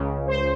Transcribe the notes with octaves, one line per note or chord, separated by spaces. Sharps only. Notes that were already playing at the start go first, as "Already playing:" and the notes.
Already playing: C#2 C#3
C5